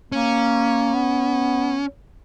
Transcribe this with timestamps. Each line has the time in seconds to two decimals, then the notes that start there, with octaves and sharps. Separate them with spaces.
0.12 A#3 C#4
0.94 B3